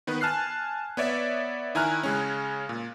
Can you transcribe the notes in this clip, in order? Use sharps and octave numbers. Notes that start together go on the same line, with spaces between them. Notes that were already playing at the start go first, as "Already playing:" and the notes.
D#3 B3 B4
G#5 A5 F6 F#6 C7
B3 C#5 D5 E5
D#3 E4 G#5 A#5 F6 F#6
C#3 G#3 C#4
A#2